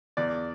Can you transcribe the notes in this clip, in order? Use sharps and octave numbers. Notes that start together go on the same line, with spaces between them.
E2 D5